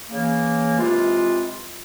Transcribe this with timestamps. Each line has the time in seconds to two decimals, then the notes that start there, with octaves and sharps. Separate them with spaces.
0.10 C#3 E3 A#3
0.76 C3 E3 G#3 C4 F4